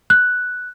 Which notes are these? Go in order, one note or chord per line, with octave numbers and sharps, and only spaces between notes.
F#6